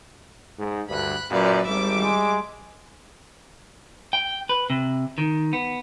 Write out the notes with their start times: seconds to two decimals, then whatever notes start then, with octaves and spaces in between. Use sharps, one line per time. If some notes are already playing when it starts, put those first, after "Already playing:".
0.59 G#2
0.89 D2 G2 B5 F#6
1.31 F#2 A#2 F#3 B4 D5
1.65 G#1 G3 E5 D6
2.02 G#3
4.13 G5
4.49 B4
4.70 C3
5.18 D#3
5.53 B3